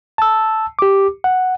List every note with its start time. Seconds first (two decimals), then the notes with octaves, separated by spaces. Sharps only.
0.18 A5 E6
0.79 G4 D6
1.24 F#5